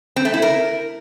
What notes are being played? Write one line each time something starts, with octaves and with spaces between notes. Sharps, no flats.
C4
A3
E4
A#4